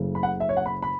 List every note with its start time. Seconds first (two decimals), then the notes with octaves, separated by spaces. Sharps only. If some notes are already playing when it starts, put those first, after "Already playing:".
Already playing: F#1 F#2 C#3 A3
0.15 B5
0.23 F#5
0.40 E5
0.49 C#5
0.57 F#5
0.66 B5
0.82 B5